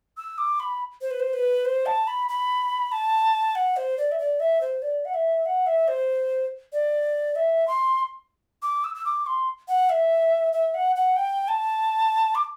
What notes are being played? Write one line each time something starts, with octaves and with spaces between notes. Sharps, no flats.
E6
D6
B5
C5
B4
C5
B4
C5
A5
B5
B5
A5
F#5
C5
D5
E5
D5
E5
C5
D5
F#5
E5
F#5
E5
C5
D5
E5
C6
D6
E6
E6
D6
C6
F#5
E5
E5
F#5
F#5
G5
A5
D6